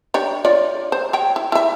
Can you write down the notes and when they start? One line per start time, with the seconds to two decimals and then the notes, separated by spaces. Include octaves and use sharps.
0.14 D4 G4 C#5
0.45 F4 C#5 D5
0.92 C5
1.13 C#5 G5
1.36 E4
1.52 E4 E5